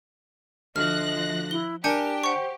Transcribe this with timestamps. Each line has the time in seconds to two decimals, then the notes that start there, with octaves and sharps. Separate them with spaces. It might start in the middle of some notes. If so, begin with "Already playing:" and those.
0.76 D2 F3 D#5 F6 F#6 A#6
1.51 E4 G7
1.84 D4 G4 A#4 G#5 G6 C#7
2.23 C5 F#5 C#6